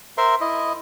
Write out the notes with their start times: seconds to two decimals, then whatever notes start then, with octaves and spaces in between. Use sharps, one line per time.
0.18 A#4 C5 E5 C6
0.41 E4 D#5